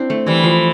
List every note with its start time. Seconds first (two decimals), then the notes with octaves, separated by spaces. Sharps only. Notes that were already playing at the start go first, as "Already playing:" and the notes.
Already playing: C4 D4 E4
0.10 A3
0.26 E3 G3
0.44 F3